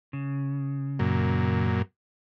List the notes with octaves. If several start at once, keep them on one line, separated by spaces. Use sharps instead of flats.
C#3
F#2 A#2